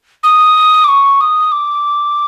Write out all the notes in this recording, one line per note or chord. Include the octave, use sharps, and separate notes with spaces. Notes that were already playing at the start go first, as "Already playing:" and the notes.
D#6
D6
C#6
D#6
D6